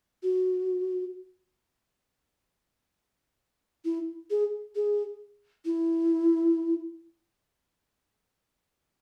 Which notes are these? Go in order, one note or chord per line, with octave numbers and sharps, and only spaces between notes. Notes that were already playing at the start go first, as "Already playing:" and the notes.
F#4
E4
G#4
G#4
E4